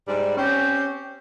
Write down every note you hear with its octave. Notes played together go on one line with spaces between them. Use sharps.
G#2 G3 D5
C4 C#4 G4